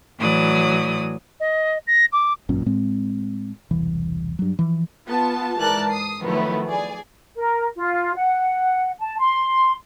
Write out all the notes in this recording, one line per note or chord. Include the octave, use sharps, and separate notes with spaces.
A2 E3 F#3 D5 D#6
D#5
A#6
D6
G#1 F#2 A#2 C#4
A2 G#3 C4
E1 C2 E3
G2 F#3
E3 F3
B3 F4 A5
G#2 E3 A#4 D5 A5 F#6
D#6 C7
D#3 F3 F#3 A3 B3 E4
G#4 D5 G#5
A#4
F4
F#5
A5
C6